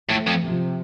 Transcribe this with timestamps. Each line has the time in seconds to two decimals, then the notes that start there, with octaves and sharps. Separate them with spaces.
0.09 A2 F3 A3
0.27 F2
0.43 C3 F3